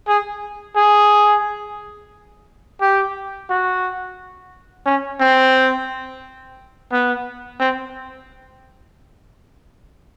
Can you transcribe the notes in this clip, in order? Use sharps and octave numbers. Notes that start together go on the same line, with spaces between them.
G#4
G#4
G4
F#4
C#4
C4
B3
C4